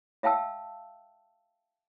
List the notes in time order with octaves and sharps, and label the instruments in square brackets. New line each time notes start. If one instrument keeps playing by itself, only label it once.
[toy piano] E5 F5 G5 A5 E6